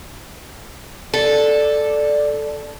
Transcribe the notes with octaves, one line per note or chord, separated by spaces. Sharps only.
A4 D5